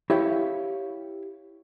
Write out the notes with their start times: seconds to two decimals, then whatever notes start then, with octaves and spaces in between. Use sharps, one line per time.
0.10 E4 G4 C#5 F5